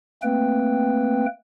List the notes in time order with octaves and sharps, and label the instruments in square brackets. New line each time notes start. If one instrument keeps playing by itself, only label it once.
[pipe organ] A3 A#3 C4 B4 G5